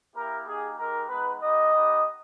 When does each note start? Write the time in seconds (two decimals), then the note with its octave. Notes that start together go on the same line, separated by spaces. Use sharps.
0.15 A#3 E4 G4 A#4
0.47 A#3 D#4 G4 G#4
0.78 G#3 D#4 G4 A#4
1.09 G#3 B3 D#4 B4
1.41 B3 D#4 G4 D#5
1.72 B3 D#4 G4